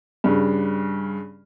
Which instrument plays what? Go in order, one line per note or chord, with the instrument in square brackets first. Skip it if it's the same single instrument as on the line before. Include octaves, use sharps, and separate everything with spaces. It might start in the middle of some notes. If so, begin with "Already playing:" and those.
[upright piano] G2 C#3